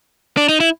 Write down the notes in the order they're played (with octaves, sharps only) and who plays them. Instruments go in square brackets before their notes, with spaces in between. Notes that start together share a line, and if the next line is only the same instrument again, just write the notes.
[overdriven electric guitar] D4
D#4
E4